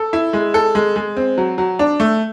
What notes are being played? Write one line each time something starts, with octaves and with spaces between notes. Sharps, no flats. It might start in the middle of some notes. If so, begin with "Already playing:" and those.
Already playing: A4
E4
G#3
A4
G#3
G#3
C4
F#3
F#3
D4
A3